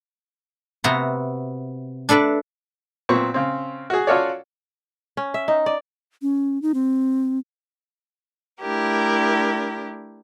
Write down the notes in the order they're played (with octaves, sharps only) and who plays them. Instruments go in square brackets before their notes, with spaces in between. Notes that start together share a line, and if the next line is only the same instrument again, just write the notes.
[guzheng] C3 B3 F#4 E5 A#5 C6
D4 A4 B4 D5 E5
[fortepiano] A#2 B3 C4 C#6
C#3 C4
F#4 G#4
C#4 F4 F#4 A4 C#5 D5
[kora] C#4
E5
D#4
D5
[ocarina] C#4
D#4
C4
[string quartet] A3 D4 E4 G4 A#4